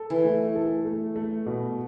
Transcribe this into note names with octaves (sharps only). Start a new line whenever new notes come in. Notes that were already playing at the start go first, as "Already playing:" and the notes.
Already playing: A4
E3
A3
A4
A3
A3
B2